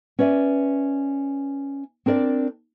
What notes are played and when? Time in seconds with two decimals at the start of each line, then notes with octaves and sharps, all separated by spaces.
0.19 C#4 B4 D5 E5
2.06 C4 D4 A#4 D5